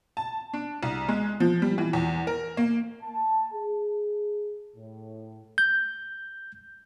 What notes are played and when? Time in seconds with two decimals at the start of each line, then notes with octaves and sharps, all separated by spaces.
0.17 A5
0.53 D4
0.83 C2
1.08 G#3
1.40 F3
1.62 G3
1.78 E3
1.93 E2
2.27 A#4
2.57 A#3
3.02 A5
3.53 G#4
4.76 A2
5.58 G6